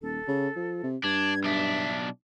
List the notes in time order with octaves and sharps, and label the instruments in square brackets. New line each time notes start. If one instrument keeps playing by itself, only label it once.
[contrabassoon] D#1 [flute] A4
[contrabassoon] C#3
F3
C3
[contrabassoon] G2 [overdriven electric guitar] D4 [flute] G#6
[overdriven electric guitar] B1 D4 [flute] E5